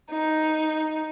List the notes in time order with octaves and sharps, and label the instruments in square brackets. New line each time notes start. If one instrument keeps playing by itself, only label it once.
[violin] D#4